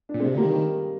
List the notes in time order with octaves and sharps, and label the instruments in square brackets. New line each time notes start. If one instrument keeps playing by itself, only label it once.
[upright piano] D4
[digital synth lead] A#2
[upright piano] G#3 C4
[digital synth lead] C3
[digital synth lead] D3 [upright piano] G3 A#3
[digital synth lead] D#3